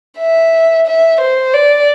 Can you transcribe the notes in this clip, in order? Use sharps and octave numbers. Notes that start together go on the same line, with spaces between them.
E5
E5
C5
D5